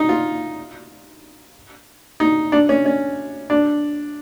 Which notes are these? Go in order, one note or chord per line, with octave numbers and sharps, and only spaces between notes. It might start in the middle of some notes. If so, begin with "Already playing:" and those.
Already playing: D#4
F4
D#4
D4
C#4
C#4
D4